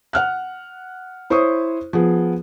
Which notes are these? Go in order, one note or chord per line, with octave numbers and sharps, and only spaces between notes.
F#5 F6 F#6
E4 C5 C#5 C#6 D#6
F3 B3 G#4